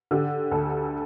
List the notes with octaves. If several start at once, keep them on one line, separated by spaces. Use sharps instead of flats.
D3 G4
D2 A4